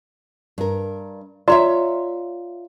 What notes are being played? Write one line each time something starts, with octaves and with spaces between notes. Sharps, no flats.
G2 A#4
F4 C#5 D5 E5 A#5 C6